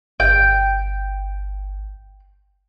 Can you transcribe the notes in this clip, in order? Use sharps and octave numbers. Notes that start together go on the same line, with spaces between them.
G1 G5